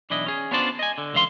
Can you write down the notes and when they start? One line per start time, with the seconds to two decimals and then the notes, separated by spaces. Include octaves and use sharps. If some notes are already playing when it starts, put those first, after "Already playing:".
0.10 B1 E3 D4 E4 D#5
0.26 C#4 G#4
0.51 B3 C#4 D4 F4 C5 D5
0.79 D#5 G#5
0.98 D3
1.14 C#2 D3 E3 F5 C6